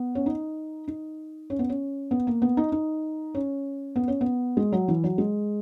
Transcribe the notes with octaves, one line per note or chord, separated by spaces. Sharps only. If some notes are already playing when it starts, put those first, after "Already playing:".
Already playing: B3
C#4
D#4
D#4
C#4
B3
C#4
B3
A#3
B3
D#4
D#4
C#4
B3
C#4
B3
G#3
F#3
E3
F#3
G#3